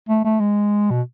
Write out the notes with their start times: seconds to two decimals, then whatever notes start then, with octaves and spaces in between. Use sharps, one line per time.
0.09 A3
0.24 A3
0.40 G#3
0.91 B2